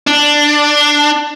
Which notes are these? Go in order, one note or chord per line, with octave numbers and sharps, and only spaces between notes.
D4